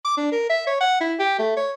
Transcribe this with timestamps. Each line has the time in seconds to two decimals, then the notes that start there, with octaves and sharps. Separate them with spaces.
0.05 D6
0.17 D4
0.32 A#4
0.49 E5
0.67 C#5
0.80 F#5
1.01 E4
1.19 G4
1.39 A3
1.57 C#5